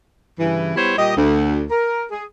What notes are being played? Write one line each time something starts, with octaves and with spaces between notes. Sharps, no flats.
G2 C#3 E3
G3 B3 E4 C5 C#5
A#2 G3 G4 D#5
D2
A#4
G#4